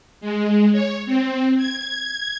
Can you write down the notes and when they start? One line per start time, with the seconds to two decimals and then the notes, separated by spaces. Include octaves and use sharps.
0.21 G#3
0.72 C#5
1.06 C4
1.57 G#6